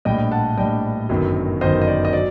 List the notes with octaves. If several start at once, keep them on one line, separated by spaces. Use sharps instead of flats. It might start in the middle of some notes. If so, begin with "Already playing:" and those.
A#1 A2 G3 D4 D#5 G5
F#5 A5
A#1 A2 G3 D4 D#5 G5
G1 F#2 D#3 F#3
G1 F#2 D#3 F#3 C5 D#5
D#5
D5
D#5
F#3 D5